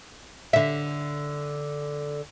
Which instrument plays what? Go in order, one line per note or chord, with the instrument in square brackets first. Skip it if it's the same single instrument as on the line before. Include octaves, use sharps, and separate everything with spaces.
[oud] D3 E5